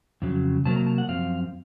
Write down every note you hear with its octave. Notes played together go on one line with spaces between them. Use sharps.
F2 C#3 F#3
C3 F#3 A#3 A5
A#5
A5
F#5
F#2 F3 C4 F5